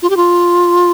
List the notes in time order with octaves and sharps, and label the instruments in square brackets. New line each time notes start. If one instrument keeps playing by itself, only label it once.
[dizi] F4
G4
F4